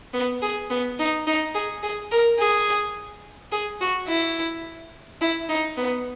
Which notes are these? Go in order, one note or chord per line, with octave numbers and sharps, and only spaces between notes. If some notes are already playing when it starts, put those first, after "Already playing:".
B3
G#4
B3
D#4
D#4
G#4
G#4
A#4
G#4
G#4
F#4
E4
E4
D#4
B3